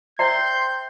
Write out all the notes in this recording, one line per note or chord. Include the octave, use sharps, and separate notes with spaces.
C5 D5 E5 G5 A#5 C6 G6